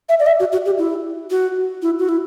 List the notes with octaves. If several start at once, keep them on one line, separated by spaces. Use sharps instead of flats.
E5
D5
E5
F#4
F#4
G4
E4
F#4
E4
F#4
E4